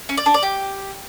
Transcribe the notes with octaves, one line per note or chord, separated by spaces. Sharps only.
C#4
D5
D4
D5
G4